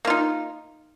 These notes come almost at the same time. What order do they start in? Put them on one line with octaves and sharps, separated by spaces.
A#3 F4 D#4